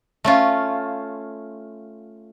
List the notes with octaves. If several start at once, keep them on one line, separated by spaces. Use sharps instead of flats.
A3 C#4 F4